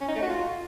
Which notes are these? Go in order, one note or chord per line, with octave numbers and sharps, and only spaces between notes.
C#4
D#4
A3
F#4
F4